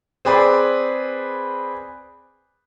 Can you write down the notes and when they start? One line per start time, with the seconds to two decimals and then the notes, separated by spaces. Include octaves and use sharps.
0.25 C4 G#4 B4 D5